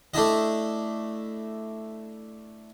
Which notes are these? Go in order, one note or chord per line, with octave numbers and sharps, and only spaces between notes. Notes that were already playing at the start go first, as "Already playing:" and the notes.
A3 D4 E4 D#5